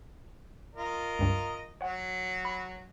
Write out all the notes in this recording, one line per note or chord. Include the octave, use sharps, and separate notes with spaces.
F4 A#4 D#5
C#2 G2
F#3 C#5 F#5
B5